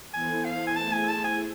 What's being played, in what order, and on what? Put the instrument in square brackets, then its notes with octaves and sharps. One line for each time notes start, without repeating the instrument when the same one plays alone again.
[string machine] E3 B3 E4 A4 C5 [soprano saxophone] G#5
[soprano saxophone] F5
G#5
[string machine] A3 E4 G#4 C5 E5 [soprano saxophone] A5
[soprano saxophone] G#5
A5
G#5